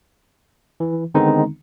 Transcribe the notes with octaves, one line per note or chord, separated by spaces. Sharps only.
E3
D3 D#3 G#3 B3 C4 D#4